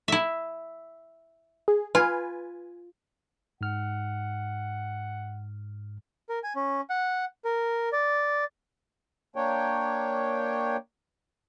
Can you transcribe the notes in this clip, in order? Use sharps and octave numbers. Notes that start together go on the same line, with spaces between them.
E4 E5
G#4
F4 B4 G#5
G#2 F#5 F6
A#4
G#5
C#4
F#5
A#4
D5
A#3 D4 C#5 G5